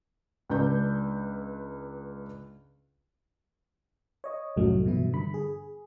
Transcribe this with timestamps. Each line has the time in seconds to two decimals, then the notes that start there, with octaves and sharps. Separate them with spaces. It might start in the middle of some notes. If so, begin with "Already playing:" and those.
0.50 C#2 D4 B4 G6
4.24 C#5 D#5
4.56 C2 F#2 A2 F#3 A3
4.85 G2 B2 E3 E4
5.13 G2 D3 B5
5.34 G#4